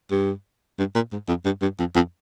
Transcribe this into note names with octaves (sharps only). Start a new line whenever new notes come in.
G2
G2
A#2
G#2
F2
G2
G2
F2
F2